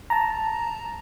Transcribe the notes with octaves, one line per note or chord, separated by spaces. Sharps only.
A5 A#5